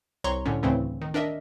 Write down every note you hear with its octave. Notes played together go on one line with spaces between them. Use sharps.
C2 C#5 A#5 C6 C#6
A2 D3 C#4
D2 A2 C#3 E3 A3 C4
D#3
D4 A#4 D#5 E5